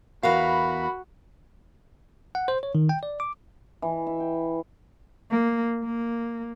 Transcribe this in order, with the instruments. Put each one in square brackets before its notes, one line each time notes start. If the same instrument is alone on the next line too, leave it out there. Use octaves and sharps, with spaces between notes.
[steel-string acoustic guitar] E2 A#4 F5 [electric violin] F#4 [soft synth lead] B5
[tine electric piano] F#5
C5
C#5
D#3
G5
D5
D6
[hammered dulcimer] E3
E5
G5
[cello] A#3
A#3